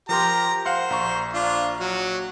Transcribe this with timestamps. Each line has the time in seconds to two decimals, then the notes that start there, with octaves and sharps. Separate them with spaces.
0.09 F3 G4 A#4 A#5 C6
0.65 C5 F5 F#5 C6
0.90 A#1 A#5 C#6
1.33 D4 F4
1.80 F#3